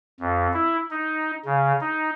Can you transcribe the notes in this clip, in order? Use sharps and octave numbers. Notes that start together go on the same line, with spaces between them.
F2
E4
D#4
C#3
D#4